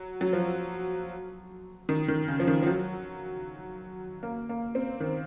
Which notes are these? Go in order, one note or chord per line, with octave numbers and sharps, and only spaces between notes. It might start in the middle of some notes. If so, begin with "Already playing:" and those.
Already playing: F#3
F#3
F3
D#3
D#3
C#3
F3
D#3
F3
F#3
A#3
A#3
C4
D#3